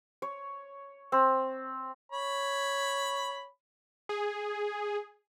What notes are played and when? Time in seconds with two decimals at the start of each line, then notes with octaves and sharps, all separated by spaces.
0.22 C#5
1.12 C4
2.12 C#5 B5
4.09 G#4